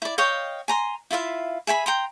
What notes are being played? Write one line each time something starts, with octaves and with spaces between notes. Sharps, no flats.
E4 D5
C#5 D#5 F5 G5
G#5 A#5 C6
E4 F4 E5 F5
G#4 E5 G#5 B5
G5 A#5 C6